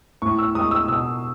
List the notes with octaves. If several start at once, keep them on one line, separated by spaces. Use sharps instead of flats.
A2 C#6
E6
G#3 D#6
E6
B2 E6